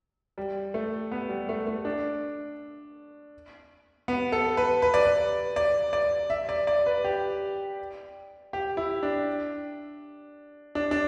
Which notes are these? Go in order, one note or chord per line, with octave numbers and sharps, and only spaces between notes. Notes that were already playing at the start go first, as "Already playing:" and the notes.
G3
A3
B3
G3
A3
A3
D4
B3
A4
B4
B4
D5
B4
D5
D5
E5
D5
D5
B4
G4
G4
E4
D4
D4
D4